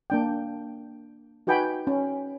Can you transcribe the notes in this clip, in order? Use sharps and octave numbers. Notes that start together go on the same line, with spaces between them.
A#3 D4 G5
D#4 F#4 B4 G5 G#5 B5
C#4